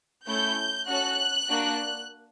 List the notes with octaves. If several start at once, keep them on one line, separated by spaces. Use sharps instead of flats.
A3 C#4 E4 A4 G6
C#4 F#4 A4 F#6
A#3 D4 F#4